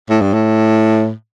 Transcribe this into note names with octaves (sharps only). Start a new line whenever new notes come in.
A2
G2
A2